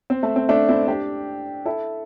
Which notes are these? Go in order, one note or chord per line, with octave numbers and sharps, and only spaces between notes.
C4
A3
C4
A3 D4
C4 E4
D4 G4
E4 A4